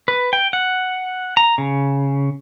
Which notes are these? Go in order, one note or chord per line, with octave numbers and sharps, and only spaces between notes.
B4
G5
F#5
A#5
C#3